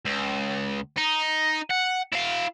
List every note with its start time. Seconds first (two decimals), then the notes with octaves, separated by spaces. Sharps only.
0.06 C#2
0.98 D#4
1.70 F#5
2.12 E4 F5